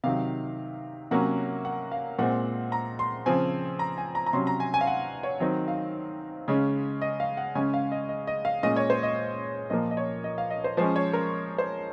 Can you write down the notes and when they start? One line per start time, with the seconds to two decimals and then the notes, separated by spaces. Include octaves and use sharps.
0.04 C3 D#3 F#3 F5
1.11 C3 F#3 A#3 C#4 F#5
1.65 F#5
1.92 F5
2.19 A#2 G#3 C4 F#5
2.72 A#5
2.99 C6
3.26 C#3 F3 C4 G#5
3.79 A#5
3.98 G#5
4.15 A#5
4.26 A#5
4.33 C3 F#3 C#4 C6
4.47 A#5
4.60 G#5
4.74 G#5
4.81 F5
4.87 F#5
5.23 C#5
5.40 D#3 F#3 C4 D#5
5.68 F5
6.48 C#3 G#3 C#4
7.02 D#5
7.20 F5
7.37 F#5
7.55 C#3 G#3 C#4 G#5
7.74 F5
7.92 D#5
8.09 D#5
8.27 D#5
8.45 F5
8.63 A#2 G#3 C#4 D#5
8.76 C#5
8.90 C5
9.03 D#5
9.70 A#2 F3 A#3 D#5
9.91 D#5
9.97 C#5
10.24 D#5
10.38 F5
10.50 D#5
10.64 C5
10.77 F3 G#3 C#4 C5
10.96 C#5
11.13 A#4
11.58 C5